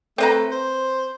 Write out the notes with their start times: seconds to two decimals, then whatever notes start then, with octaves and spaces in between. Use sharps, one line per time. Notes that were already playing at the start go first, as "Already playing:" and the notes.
0.18 A3 C4 B4 A#5
0.51 C5